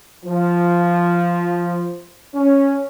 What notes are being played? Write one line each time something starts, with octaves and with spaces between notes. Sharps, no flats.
F3
C#4